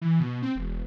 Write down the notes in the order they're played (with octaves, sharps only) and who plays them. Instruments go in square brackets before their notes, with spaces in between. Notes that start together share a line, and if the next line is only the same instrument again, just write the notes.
[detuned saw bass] E3
B2
C4
E1